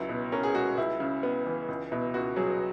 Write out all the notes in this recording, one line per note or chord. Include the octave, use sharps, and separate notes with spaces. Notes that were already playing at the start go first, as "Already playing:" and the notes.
Already playing: C#2 F#3 E4
B2
C#4 A#4
G#4
G#3 F#4
C#2 E4
C#3
B3
E3
C#2
B2 E4
C#2 F#4
F#3 G#4